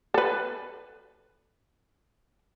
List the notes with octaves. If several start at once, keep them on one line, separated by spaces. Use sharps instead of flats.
A4 B4